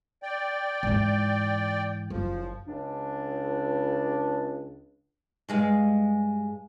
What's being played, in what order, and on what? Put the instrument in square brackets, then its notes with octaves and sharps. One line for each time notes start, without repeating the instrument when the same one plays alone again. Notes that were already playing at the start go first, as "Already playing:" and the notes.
[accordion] D5 G5
[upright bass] G#2 E3
[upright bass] F#1 [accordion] F3
[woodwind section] C#2 D4
[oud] G2 G#3 F5